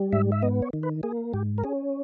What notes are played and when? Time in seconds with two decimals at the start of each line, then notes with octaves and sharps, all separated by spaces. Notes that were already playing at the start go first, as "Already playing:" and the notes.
Already playing: G3
0.13 G#2 E5
0.32 E5
0.42 B3 D#5
0.62 C#5
0.73 D#3
0.83 B4
1.03 A#3 G#4
1.33 G#2 G4
1.58 A#4
1.64 C#4 G#4